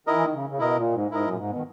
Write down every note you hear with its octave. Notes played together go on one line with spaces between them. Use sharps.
D#3 E4 A#4 D#5
E3
D#3
C#3
C#3
B2 E4 A#4 D#5
A#2
G#2
G#2 E4 A#4 D#5
F#2
A#2
G#2
B2
D#3